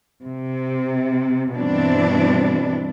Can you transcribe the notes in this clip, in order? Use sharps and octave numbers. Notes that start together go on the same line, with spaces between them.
C3
G2 B2 E3 G3 C4 D4